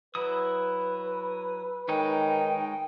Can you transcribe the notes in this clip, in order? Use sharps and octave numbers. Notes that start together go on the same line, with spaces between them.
F#3 E4 B4 D#6
D#3 G#3 D#4 C#5 G5